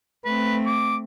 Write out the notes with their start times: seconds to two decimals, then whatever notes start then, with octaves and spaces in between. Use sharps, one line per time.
0.25 A3 C4 B4
0.66 D6